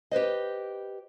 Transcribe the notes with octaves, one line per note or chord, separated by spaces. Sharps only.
G4 B4 C5 D#5